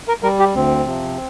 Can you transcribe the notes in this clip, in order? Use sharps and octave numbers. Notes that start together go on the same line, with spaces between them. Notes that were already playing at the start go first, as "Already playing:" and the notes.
A#4
G3 A#4
G4
D2 C4
C3 F3